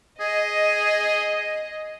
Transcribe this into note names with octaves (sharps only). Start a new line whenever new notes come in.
G#4 D#5